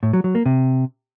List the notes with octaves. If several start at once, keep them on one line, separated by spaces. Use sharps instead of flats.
A2
F#3
F#3
A#3
C3